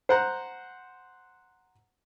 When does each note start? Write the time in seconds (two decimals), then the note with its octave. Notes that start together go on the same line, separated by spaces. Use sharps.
0.09 C5 F#5 A#5